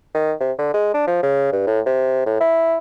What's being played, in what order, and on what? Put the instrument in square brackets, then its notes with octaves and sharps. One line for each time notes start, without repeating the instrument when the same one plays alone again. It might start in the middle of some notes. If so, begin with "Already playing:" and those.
[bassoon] D#3
C3
D3
G#3
D4
F3
C#3
G2
A2
C3
A2
E4